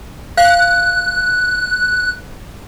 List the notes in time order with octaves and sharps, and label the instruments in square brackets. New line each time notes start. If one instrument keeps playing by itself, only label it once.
[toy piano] F5 [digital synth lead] F#6